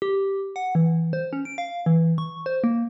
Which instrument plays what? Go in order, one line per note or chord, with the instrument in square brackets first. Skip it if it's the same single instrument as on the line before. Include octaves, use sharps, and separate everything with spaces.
[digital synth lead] G4
F#5
E3
C5
C#4
D7
F5
E3
C#6
C5
A#3